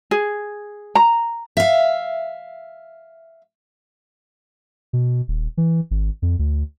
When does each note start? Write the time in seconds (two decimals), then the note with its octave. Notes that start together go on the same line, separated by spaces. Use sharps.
0.11 G#4
0.95 A#5
1.57 E5 F5
4.93 B2
5.28 D#1
5.57 E3
5.91 G#1
6.22 F2
6.39 D2